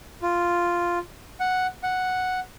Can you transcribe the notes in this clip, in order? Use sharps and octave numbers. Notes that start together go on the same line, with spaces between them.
F4
F#5
F#5